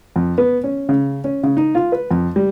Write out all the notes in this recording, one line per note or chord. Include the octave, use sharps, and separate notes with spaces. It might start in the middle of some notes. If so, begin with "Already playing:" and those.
F2
B3
C#4
C#3
C#4
C#3
D#4
F4
B4
F2
G3